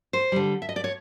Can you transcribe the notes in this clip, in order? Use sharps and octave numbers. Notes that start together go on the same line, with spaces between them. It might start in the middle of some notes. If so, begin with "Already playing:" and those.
C5
D3 G3
E5
D#5
D5
C#5